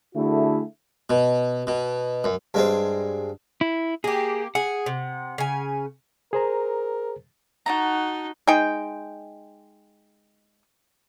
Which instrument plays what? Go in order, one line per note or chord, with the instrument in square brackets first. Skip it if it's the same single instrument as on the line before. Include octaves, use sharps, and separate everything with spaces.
[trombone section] D3 A3 E4 F#4 G#4
[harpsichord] B2
B2
F#2
G2 G#3 C4
[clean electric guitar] E4
[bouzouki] A#3 G4 [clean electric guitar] G#4
[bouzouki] G#4 [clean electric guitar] F#5
[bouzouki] C3
C#3 G#5
[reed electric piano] G#4 C5 A#5 [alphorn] A#4
[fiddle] D#4 [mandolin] F#4 A5 A#5
[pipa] G#3 D#4 G5